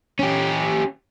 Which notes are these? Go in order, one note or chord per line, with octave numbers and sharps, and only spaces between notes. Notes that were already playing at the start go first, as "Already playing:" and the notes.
C#4 G4